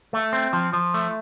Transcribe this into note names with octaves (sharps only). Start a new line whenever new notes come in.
A3
C4
F3
F3
A3